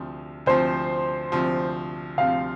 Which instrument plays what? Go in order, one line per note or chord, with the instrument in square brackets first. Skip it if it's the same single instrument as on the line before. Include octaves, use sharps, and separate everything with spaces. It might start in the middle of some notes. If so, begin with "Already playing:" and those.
Already playing: [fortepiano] D2 C3 F3
[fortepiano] D2 C3 F3 [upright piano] C5
[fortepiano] D2 C3 F3
[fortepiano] D2 C3 F3 [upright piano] F5